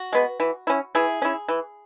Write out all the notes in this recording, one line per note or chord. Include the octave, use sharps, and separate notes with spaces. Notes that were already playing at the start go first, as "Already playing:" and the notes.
Already playing: F#4
G#3 B3
E3
C#4 E4
E3 E4 G#4
C#4 E4
E3